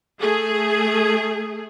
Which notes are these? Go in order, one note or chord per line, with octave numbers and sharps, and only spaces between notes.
A3 G#4